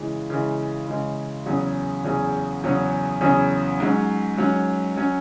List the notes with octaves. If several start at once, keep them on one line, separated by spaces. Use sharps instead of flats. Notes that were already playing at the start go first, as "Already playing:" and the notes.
Already playing: C#3 E3 G#3
C#3 E3 G#3
C#3 E3 G#3
E2 C#3 F#3 C#4 G#4
E2 C#3 F#3 C#4 G#4
E2 C#3 F#3 C#4 G#4
E2 C#3 F#3 C#4 G#4
G#2 F#3 C#4
G#2 F#3 C#4
F#3 C#4